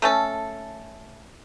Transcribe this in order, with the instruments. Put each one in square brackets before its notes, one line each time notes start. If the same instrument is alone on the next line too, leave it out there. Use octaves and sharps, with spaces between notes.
[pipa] A3 C#4 A4